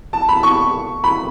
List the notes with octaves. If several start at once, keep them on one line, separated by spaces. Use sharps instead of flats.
A5
B5
C#6
B5